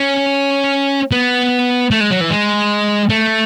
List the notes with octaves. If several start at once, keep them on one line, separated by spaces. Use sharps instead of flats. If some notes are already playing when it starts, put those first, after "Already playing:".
Already playing: C#4
B3
A3
G#3
F#3
E3
G#3
A3